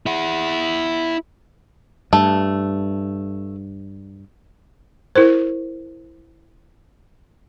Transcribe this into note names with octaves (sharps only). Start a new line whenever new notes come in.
E4 F#5
G2 A3
E4 A#4 C5